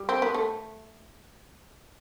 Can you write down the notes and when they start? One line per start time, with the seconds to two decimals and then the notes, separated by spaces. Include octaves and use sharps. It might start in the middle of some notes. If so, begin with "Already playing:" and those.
Already playing: G3
0.09 C4
0.22 B3
0.35 A3